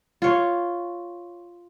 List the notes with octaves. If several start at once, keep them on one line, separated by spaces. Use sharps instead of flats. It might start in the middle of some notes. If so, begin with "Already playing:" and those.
F4 C#5